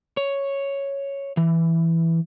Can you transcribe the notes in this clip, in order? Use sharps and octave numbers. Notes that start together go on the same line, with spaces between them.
C#5
E3